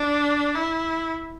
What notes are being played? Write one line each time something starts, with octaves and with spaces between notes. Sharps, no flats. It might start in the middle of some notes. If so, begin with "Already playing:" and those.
Already playing: D4
E4